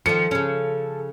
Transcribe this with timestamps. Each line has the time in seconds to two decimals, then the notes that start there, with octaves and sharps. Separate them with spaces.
0.06 D#3 F3 A4 C#7
0.31 C#3 C#4